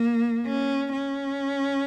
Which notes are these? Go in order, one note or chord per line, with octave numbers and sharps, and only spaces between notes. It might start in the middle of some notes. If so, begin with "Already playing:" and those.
Already playing: A#3
C#4
C#4